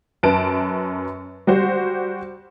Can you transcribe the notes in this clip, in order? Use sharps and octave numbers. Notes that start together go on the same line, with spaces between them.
F#2 B4 A5 D7
G3 F#4 C5